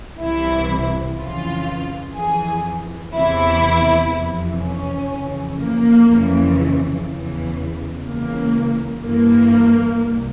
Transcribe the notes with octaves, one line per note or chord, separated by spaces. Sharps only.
C2 C3 E3 E4
F2 C#3 E3 F4
F2 E3 G#4
E2 C3 E3 E4
F2 C3 E3
C#4
F2 C#3 E3
A#3
F2 C#3 E3
E2 C#3 E3
C#2 C#3 E3 A#3
G2 E3 A#3
C2